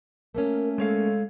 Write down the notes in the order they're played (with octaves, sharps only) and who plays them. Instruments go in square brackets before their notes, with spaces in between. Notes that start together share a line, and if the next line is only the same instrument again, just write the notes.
[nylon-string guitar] A3 A#3 C#4 [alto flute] A#4
[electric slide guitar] G#3 C#5 F5 [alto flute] A4